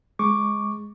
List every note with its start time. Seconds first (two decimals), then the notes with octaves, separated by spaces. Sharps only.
0.19 G#3 C#6 D6